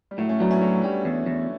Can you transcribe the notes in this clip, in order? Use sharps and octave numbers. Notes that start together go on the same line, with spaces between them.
G3
A2 F#3 A3
A3 C#4
F#3 B3 D4
C#4 E4
A2 D4 F#4
G3
E2
E2